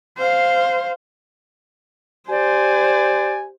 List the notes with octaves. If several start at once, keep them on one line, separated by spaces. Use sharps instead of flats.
C5 F5
G4 C5 D5 G#5